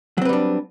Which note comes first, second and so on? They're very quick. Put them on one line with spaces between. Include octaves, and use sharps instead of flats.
F#3 C4 B4 G3 D4